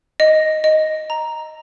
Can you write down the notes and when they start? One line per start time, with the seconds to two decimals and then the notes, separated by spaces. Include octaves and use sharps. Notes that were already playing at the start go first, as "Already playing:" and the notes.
0.20 D#5
0.64 D#5
1.10 A#5